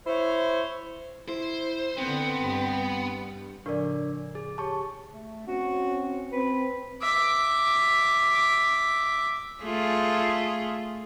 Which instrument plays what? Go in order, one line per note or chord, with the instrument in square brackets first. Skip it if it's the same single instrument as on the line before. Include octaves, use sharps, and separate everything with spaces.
[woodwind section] E4 C5 C#5
[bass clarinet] E4 [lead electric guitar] C5
[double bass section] D3 [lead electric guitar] B3 [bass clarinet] C4
[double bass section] G2
G2
[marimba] A2 C#3 F3 [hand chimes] D4 A#4 D5
[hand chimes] G#4
[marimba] G4 C#5 [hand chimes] A5 C#6
[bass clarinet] A3
[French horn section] C4 C#4 [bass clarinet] F#4
[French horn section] C4 [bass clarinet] B4
[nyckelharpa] E5 D6
[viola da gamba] A3 F4 G#4